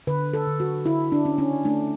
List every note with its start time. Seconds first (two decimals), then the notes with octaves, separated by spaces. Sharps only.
0.07 D3 B4
0.34 A4
0.47 D3
0.60 F#4
0.86 D3 E4
1.12 D4
1.25 C#4
1.38 C#4
1.65 A3 D4